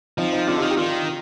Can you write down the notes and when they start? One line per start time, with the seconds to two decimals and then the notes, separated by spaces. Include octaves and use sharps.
0.18 F3 C4 D#4
0.32 C4 D#4
0.47 D3 D4 F4
0.58 D#4 G4
0.62 D#3
0.71 G4
0.77 D#3 D4 F4